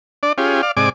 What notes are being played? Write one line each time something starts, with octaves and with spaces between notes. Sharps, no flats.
D4 D5
C#4 F4 G4 G#4
D5 F5
G#2 C3 D5 G#5 D6